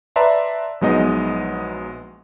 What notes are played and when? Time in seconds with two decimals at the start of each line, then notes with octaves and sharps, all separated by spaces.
0.16 B4 D5 E5 A5 A#5 C6
0.81 A#1 F#3 G#3 B3 D#4 D#5